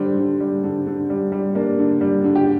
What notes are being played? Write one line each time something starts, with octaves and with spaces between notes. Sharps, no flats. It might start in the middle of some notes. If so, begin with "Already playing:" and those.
Already playing: D3 G3 C5
D3
G3
D3
D3
G3
G3
A#3 D4
D3
G3
D3
G4